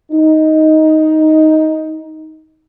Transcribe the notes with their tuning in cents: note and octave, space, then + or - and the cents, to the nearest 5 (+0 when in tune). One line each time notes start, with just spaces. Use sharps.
D#4 +10